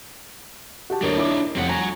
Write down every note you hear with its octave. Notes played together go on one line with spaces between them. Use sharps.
F#4 G4 A5
D#1 D4 D#4 A#4 C#5
E4 C#5 D6
F1 C4 F#5
F#4 G#5 A#5